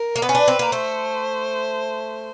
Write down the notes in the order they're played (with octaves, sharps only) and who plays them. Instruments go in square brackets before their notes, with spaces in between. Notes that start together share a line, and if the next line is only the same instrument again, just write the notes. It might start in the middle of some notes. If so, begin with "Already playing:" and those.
Already playing: [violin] A#4
[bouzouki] A#3
[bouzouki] B3 [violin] B4
[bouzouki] C#4
D4
C4
A#3
[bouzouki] A3 [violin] C5